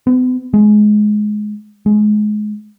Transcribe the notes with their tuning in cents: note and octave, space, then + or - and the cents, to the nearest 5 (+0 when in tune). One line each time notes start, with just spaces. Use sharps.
B3 +40
G#3 +20
G#3 +25